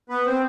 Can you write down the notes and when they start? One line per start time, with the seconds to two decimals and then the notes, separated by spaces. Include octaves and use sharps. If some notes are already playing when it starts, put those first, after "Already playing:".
0.09 B3 B4
0.25 C4 C5